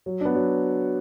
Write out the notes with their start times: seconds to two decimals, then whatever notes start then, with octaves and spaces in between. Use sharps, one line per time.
0.06 F#3
0.21 B3 D4
0.35 F#3